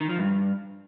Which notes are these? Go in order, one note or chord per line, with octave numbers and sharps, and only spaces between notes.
D#3
F3
G2